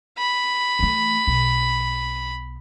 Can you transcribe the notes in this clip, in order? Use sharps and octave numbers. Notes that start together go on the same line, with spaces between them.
B5
E3 A3
B1